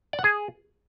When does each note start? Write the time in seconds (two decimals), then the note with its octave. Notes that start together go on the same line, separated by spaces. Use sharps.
0.13 D5
0.19 F#5
0.24 G#4